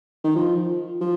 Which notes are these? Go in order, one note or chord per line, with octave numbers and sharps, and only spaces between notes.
D#3
F3
F3